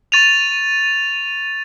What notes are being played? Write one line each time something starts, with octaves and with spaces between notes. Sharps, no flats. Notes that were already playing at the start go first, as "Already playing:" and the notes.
C#6 A6 D#7 F7